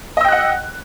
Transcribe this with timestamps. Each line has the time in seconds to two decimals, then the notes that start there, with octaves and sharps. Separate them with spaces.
0.17 D#5
0.21 E6
0.25 G5
0.28 F#6
0.32 F#5